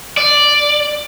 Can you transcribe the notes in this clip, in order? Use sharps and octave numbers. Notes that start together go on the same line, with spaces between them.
D5